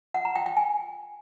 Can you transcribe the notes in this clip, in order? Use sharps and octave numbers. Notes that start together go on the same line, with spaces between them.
F#5
A#5
G5
G5
G#5